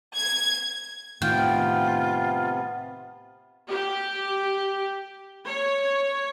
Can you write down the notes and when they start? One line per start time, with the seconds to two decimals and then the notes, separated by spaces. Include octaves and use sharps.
0.16 G#6
1.22 A2 C3 D#3 B3 F4 G5
3.69 G4
5.47 C#5